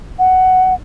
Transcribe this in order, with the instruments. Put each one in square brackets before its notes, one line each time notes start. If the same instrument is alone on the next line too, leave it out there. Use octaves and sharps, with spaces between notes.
[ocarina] F#5